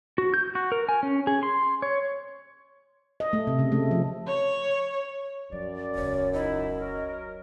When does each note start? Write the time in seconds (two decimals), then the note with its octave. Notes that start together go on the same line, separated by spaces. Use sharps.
0.18 F#4
0.34 G6
0.55 F#4
0.72 A#4
0.89 G#5
1.03 C#4
1.27 G#4
1.43 C6
1.82 C#5
3.20 D#5
3.33 A3
3.47 C3
3.59 C#3
3.72 A3
3.91 F3
4.26 C#5
5.52 F#2 F3 D5
5.95 E1 C#2 C#5
6.33 D#4 E4 D#5
6.80 F#3 F#4 A#4